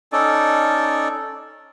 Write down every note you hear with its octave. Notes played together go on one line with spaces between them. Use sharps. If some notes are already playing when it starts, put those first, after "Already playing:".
C#4 D#4 A4 D5